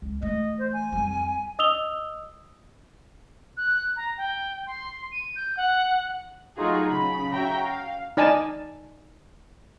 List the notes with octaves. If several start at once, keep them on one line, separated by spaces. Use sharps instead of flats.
C#2
E3 A3 D#5
C5
G#5
F2 G3
D#5 D#6 E6 F7 G7
F#6
A#5
G5
C6
D#7
G6
F#5
F#3 A3 D#4 F4 F#4 G#4
C#3 B5
F#4 C#5 E5 G5 A#5
F5
D#4 D5 G#5 A5